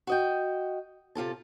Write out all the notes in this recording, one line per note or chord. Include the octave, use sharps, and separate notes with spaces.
F#4 D#5 G5
C3 F4 A4 A5